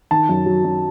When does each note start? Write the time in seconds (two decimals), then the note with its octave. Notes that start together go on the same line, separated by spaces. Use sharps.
0.11 D#3 A5
0.29 F#2
0.46 F#3
0.64 F#2